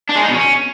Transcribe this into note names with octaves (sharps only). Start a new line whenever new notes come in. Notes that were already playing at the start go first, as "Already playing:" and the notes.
D4
G#3
D#4
B2
C#4